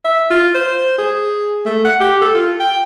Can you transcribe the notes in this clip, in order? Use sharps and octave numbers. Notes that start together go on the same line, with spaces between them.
E5
F4
C5
G#4
A3
F#5
G4
A4
F4
G5